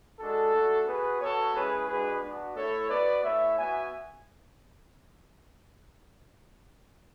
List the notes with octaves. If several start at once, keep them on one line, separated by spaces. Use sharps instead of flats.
G#3 D4 F#4 A4
A3 D4 F#4
B3 F#4 G#4 B4
B3 F#4 A4 C#5
G#3 C#4 E4 G#4 B4
G#3 D4 F#4 G#4 B4
B3 D4 F#4
A3 E4 A4 C#5
B3 F#4 B4 D5
A3 E4 C#5 E5
B3 F#4 E5 G#5